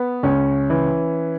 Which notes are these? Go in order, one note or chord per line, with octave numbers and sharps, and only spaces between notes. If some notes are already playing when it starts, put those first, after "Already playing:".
Already playing: B3
C#2 C#4
E3